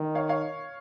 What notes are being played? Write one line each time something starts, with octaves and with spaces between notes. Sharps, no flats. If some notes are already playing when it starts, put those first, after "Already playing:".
Already playing: D#3
C#5 F5
C#5 F5